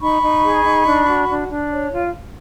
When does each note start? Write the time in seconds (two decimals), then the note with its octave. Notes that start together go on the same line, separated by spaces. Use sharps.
0.01 D#4 B5 C#6
0.22 D#4
0.44 G#4
0.64 D#4
0.86 D4
1.07 F#4
1.28 D4
1.49 D4
1.71 C#5
1.91 F4